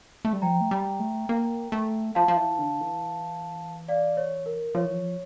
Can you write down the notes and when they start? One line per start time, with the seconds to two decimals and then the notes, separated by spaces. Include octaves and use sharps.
0.25 A3
0.33 G3
0.42 F3 G5 A#5
0.61 A3
0.71 G3
1.00 A3
1.29 A#3
1.72 A3
2.15 F3 F5 A5
2.28 F3
2.37 E3
2.59 D3
2.81 E3
3.88 D5 F5
4.17 C#5
4.46 A#4
4.75 F3 C#5
4.85 E3
4.94 F3